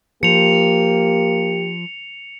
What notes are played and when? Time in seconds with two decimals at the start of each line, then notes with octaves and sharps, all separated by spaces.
0.23 F3 A#3 G4 C#7 F7